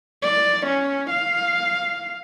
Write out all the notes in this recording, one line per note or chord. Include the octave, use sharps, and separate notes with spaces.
D5
C#4
F5